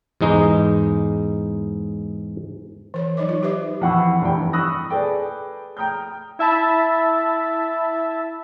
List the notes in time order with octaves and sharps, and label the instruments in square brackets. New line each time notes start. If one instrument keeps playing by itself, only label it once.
[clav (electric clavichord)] E2 G#2 G#3 D#4
[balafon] E3 A#4 C#5
F#3 D#4 C#5 D#5 D6
F4 C#5
D#4 G4 B4 C5 E5 D6
[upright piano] F2 E3 F#5 B5 C#6 E6
F1 G2 E3 G5
B5 C#6 D#6 E6 F#6 A#6
G#4 A4 B4 D5 G5
G5 A#5 D#6 F6 G6
[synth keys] E4 E5 A5 B5